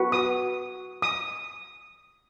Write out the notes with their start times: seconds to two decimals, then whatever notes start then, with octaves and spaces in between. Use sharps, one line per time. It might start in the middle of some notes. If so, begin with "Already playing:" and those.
Already playing: F#4 B4
0.12 D#6
1.02 D#6